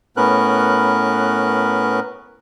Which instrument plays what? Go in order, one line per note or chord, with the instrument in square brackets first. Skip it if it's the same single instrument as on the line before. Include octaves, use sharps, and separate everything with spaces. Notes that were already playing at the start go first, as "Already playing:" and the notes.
[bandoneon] A2 B3 C#4 A#4 B4 F#6